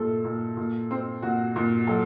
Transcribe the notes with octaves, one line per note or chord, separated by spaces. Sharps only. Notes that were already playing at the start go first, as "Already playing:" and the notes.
Already playing: A#2 A3 A4
A#2
A#2
C4
A#2 F#4
A#2
F#3 A4